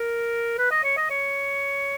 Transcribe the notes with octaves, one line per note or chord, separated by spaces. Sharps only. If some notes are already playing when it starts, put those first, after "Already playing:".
Already playing: A#4
B4
D#5
C#5
D#5
C#5